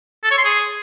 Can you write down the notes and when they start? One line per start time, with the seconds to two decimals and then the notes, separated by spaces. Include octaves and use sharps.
0.24 A4
0.31 C#5
0.38 C6
0.45 G#4